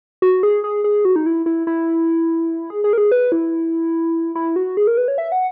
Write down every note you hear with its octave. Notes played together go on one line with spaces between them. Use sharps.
F#4
G#4
G#4
G#4
F#4
D#4
E4
E4
E4
G#4
G#4
A#4
G#4
B4
E4
E4
F#4
G#4
A#4
B4
C#5
E5
F#5